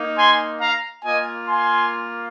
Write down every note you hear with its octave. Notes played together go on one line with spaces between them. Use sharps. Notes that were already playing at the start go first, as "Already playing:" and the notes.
Already playing: A#3 D#4
G#5 C6
F5 A#5
A#3 F4 D#5 G#5
G#5 C6